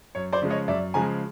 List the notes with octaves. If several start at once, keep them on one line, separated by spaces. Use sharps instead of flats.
F#2 C#5
C5 D5
C#3 F3 G#3
C#5 D#5
F#2 D5 E5
C#3 F3 G#3 G#5 A#5